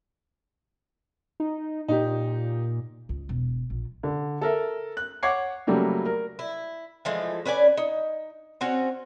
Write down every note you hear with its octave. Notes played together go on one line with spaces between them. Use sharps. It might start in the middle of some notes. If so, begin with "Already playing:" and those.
D#4
A#2 D#4 G4
C#2
E1
A#1
D3
A4 A#4 E5
F#6
C#5 F#5 C#6 D6 G#6 C7
C#3 F#3 G3 A3 A#3
A#4
E4
E3 F3 G#3 A3
C#4 B4 D5 G#5
D#4
C4 C#4 F#4